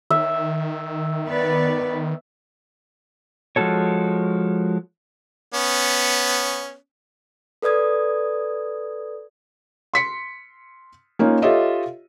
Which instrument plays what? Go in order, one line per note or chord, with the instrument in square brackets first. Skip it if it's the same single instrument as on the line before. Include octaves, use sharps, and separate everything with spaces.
[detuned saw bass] D#3 [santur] E5
[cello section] B3 B4 D5
[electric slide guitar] F3 G#3 E4 F#4 A4 C#5
[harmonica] B3 C#4
[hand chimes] A4 B4 D5 D#6 G#6
[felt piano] C6 B6 C#7
A#3 C#4 D#4 F4
F4 G4 A4 C#5 D#5 E5